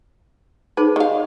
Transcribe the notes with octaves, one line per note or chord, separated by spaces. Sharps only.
D#4 G#4 B4 C5
D#3 F5